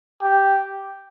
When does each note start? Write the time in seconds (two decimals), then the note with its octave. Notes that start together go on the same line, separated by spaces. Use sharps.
0.22 G4